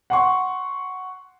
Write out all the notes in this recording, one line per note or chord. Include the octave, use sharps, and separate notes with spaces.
F#5 C6 C#6